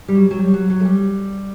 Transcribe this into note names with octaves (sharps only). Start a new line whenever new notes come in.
G3
F#3
F#3
G3
F#3
F#3
A3
G3